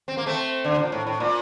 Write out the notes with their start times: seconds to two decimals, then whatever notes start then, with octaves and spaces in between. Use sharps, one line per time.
0.08 C4
0.17 A#3
0.26 A3 C4
0.65 D3
0.79 A#2
0.92 A2
1.07 A2
1.20 A#2